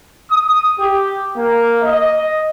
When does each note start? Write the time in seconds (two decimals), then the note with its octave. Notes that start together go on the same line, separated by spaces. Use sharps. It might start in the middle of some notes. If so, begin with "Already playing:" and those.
0.31 D#6
0.80 G4
1.36 A#3
1.83 D#5